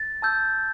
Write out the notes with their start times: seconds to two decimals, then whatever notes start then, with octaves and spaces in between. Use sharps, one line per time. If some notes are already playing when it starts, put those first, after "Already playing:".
Already playing: A6
0.22 A5 E6 G6